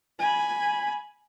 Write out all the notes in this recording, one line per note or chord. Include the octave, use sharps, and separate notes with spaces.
G#5 B5